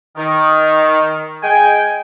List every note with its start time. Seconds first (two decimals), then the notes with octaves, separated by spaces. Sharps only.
0.16 D#3
1.43 G#3 G5 G#5